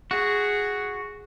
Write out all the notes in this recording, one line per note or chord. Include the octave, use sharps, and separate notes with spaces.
F#4 G#4